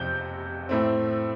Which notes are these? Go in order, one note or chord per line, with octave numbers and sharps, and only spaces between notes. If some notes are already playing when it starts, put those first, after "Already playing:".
Already playing: F2 C3 C4 G6
A2 A3 C4